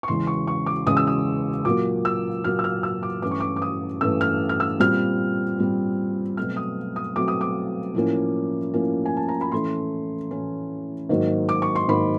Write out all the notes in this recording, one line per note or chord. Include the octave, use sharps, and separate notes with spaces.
C#6
E2 C#3 E3 G#3 C#4 C6
C#6
C#6
D6
E2 C#3 E3 G#3 C#4 D#6
E6
D#6
A#2 F#3 A#3 D6
E6
A#2 F#3 A#3 F6
E6
F6
E6
D6
G2 E3 A3 C#4 D6
C#6
D6
D6
D#6
G2 E3 A3 C#4 E6
F6
F6
E6
A#2 G3 C4 F6
A#2 G3 C4
B2 F#3 A3 C4 F6
D#6
D#6
B2 F#3 A3 C4 D6
D#6
D6
A2 F3 A#3 C#4
A2 F3 A#3 C#4
G#5
A5
A#5
B5
A2 E3 A3 C#4 C6
A2 E3 A3 C#4
G#2 D#3 F#3 A#3
D6
C#6
C6
G#2 D#3 F#3 A#3 B5